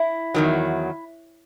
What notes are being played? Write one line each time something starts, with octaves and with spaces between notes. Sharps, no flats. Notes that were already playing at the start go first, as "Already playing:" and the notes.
Already playing: E4
E2 D#3 F#3